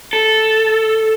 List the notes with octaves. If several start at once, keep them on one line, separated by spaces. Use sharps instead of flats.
A4